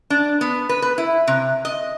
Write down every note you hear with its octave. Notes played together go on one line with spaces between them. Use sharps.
D4
B3
B4
B4
E4
C3
D#5